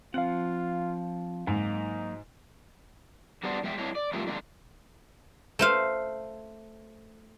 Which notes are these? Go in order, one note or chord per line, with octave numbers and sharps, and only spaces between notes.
F3 C4 F4 F5 F#5
G#2 F#3 A#3 D#4
G3 B3 D4 F#4 C5
E2 G#3 E5 G5
G2 D4 E4 C#5 D#5
D5
C3 G3 A3 F4 A4 A#4
D3 D#3 G#3 A#3
A3 C5 F5